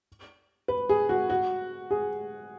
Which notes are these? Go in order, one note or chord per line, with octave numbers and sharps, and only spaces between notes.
B4
G#4
F#4
F#4
G#4